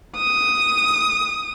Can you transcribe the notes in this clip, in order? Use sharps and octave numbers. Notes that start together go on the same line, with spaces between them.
D#6